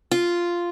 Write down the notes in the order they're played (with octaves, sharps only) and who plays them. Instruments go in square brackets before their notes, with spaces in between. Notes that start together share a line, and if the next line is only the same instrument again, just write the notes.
[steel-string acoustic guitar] F4